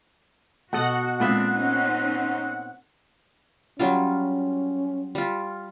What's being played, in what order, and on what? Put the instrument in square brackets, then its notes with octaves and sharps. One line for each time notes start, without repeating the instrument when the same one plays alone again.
[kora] B2 A4 D#5 [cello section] F#4 [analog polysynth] F#5
[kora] A#2 B3 E5 [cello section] G#3 C4 D4
[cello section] C4 C#4 D#4
[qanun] F#3 G3 F4 [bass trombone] C#4
[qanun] G3 F4